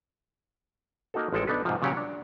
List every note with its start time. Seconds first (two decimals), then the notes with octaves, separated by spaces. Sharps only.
1.14 A#3 D#4 F#4 A4
1.32 A1 F3 G#3 A4 G5
1.47 B3 D4 D#4 A4 B4
1.65 G#2 C3 F3
1.82 A#2 C#3 F#3 G4 C#5 F#5
1.97 D4